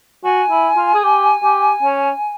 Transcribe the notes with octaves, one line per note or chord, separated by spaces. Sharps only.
F#4 G#5
E4
F4
G#4
G4
G4
C#4